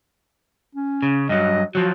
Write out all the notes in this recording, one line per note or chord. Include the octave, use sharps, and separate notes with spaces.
C#4
C#3
G2 F#3 D#5
F3 F#3 F#4